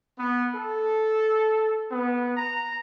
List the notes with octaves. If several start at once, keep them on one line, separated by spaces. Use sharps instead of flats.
B3
A4
B3
A#5